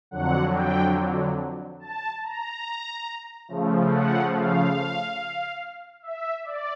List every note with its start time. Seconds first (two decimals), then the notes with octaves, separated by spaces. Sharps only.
0.11 F2 D3 F#3 F#5
0.53 G5
1.80 A5
2.22 A#5
3.48 C#3 F3 A3
3.92 F#5
4.34 F5
6.02 E5
6.45 D5